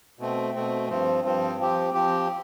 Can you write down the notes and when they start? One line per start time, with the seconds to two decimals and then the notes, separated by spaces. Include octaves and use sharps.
0.19 B2 A3 C4
0.55 B2 A3 C4
0.89 G2 F3 C4
1.24 G2 F3 C4
1.59 F3 C4 G4
1.94 F3 C4 G4